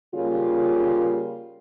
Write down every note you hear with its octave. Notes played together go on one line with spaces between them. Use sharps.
C#3 G3 A#3 F4